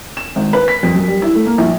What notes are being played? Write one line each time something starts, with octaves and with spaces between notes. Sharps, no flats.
E7
G#1
B4
B6
F2
F#2
G3
E4
A3
A#3
A#1